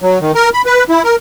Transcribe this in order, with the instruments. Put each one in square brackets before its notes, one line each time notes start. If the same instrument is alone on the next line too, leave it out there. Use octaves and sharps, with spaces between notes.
[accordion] F#3
D#3
A#4
B5
B4
E4
A#4